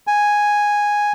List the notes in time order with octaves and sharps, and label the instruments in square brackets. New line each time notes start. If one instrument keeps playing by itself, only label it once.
[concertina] G#5